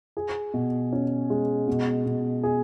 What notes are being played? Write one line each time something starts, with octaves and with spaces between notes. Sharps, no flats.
G#4
B2
C#4
G#3
B2
B2
G#4